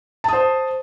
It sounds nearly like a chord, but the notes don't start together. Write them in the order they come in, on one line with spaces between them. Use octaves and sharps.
A5 D#6 C5